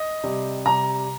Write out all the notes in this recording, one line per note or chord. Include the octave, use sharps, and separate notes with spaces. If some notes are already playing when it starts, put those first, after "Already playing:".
Already playing: D#5
C3 G3
C3 G3 A#5